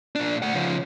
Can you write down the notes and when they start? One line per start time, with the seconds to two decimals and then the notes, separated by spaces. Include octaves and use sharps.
0.15 A#2 D4
0.42 A3 F#5
0.54 C#3 F3